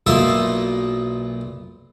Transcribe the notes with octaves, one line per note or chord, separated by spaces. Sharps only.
B1 A#2 D#4 E5 C6